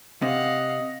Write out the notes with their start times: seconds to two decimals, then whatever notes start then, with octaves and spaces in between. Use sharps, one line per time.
0.22 C3 D#5 F5 F#5